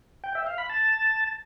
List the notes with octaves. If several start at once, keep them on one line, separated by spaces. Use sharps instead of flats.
G5
E5
F5
B5
A5